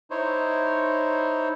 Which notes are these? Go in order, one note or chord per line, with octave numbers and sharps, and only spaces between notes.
D#4 E4 C5 C#5